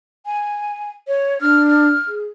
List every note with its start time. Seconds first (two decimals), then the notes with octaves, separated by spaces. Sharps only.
0.26 G#5
1.08 C#5
1.41 D4 F6
1.67 F6
2.08 G#4